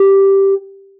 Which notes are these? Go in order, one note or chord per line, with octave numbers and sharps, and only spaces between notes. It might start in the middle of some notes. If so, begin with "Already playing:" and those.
Already playing: G4